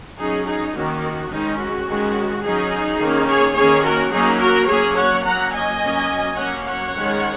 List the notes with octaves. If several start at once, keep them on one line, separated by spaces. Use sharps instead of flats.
F#3 C#4 D#4 G#4
D#4 G#4
D#3 A#3 C#4 F#4
F#4
D#3 G#3 C#4 D#4
F#4
D#3 G#3 C#4
F#3 C#4 D#4 G#4
D#3 A#3 C#4
G#4 C#5
D#3 A#3 C#4 G#4 C#5
F#4 A#4
F#3 A#3 C#4 D#4 G#4
F#4 A#4
F#3 A#3 C#4 G#4 C#5
C#5 F#5
F#3 A#3 C#4 F#5 A#5
D#5 G#5
F#3 A#3 C#4
F#3 A#3 C#4 C#5 F#5
C#5 F#5
D#3 G#3 C#4